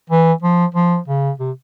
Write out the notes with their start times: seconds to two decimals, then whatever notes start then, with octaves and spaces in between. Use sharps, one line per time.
0.10 E3
0.42 F3
0.75 F3
1.08 C#3
1.40 C3